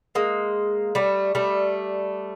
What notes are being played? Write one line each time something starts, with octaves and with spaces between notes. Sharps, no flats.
G#3 A#3
G3 A3
G3 A3